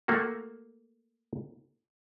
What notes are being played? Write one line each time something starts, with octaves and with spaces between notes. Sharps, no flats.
A3 A#3 F#4